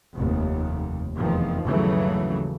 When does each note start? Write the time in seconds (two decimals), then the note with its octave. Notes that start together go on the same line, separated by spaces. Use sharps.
0.15 F1 D#2
1.18 F1 E2 D#3 F3
1.64 G1 D#2 C#3 E3 F#3 A3